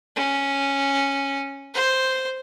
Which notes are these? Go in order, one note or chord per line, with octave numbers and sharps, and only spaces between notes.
C#4
C5